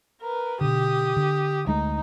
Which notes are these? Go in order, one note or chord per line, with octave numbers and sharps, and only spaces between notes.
A#4 B4
B2 D3 G4 D#6
D3
D2 G#3 A3 D#4